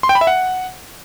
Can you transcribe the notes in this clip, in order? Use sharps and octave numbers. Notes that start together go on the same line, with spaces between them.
C6
G5
B5
E5
F#5